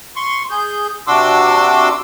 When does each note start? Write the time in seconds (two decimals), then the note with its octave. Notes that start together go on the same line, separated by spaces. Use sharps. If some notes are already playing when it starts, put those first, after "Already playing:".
0.16 C6 C#6
0.51 G#4 G6
1.07 C3 D4 F#4 C6 D6 E6